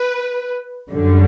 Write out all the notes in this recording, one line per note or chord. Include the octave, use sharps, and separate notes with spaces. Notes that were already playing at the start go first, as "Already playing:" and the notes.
Already playing: B4
F#2 D3 G3